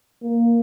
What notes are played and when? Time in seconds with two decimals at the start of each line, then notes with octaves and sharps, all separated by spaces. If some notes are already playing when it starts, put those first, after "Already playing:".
0.23 A#3